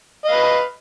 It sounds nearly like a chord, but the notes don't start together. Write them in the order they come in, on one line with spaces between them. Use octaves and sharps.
D#5 F5 B4